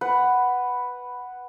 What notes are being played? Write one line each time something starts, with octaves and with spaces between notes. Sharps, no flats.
B4 F#5